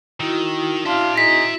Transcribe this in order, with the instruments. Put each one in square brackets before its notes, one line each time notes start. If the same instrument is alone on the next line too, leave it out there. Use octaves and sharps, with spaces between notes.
[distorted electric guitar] D#3 [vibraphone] E4 F#4
[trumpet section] D4 F5 [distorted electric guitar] E5 C6
[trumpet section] D#4 G#4 [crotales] A#6 B6